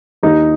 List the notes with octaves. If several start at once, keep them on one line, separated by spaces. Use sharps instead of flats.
D#2 D#3 D#4